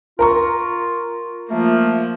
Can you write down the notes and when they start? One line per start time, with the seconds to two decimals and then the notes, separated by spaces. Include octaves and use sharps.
0.19 F4 A#4 A#5 C#6
1.50 F3 A3 A#3